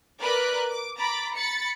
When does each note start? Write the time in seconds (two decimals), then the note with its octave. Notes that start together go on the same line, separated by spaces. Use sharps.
0.20 A#4 B4 D5 B5 D6 F#6
0.66 D6
0.97 A#5 B5 D6 A6
1.34 B5 A6 C#7